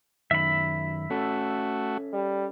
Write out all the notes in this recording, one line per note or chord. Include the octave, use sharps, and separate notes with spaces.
F#2 D#3 E5 B5
A3 C#4 F#4 A4
G3